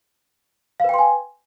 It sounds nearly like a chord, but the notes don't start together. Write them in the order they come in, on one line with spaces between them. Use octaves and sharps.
F5 B4 G5 C6 G#5